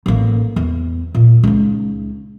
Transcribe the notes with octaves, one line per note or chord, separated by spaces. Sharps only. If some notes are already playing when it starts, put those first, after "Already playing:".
A1 A#3
E2
A#2
C#2 D#4